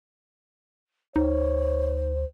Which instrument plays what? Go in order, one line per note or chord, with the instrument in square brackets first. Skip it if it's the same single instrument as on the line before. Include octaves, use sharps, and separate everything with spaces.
[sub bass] D2 [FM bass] D#4 [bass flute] C5 [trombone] C#5